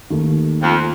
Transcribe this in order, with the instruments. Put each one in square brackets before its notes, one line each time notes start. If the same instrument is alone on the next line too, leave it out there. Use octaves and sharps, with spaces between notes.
[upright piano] D#2 D#3 A3
[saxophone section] F2